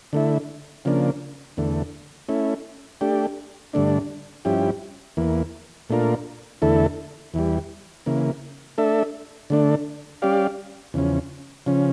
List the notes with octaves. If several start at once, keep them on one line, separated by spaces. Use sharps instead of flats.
D3 A3 E4
C#3 F3 A#3 D4
E2 D3 A3
A3 C#4 E4
A3 D4 G4
G2 D3 A3 D4
G2 F3 C#4 E4 G4
E2 E3 A#3
A#2 A3 D4 F4 A#4
E2 D3 A3 E4 A4
E2 E3 G3
C#3 E3 A#3
A3 D4 A4 E5
D3 A3 D4
G3 C#4 G4 D5 F5
E2 C#3 F3 C#4
C#3 F3 C#4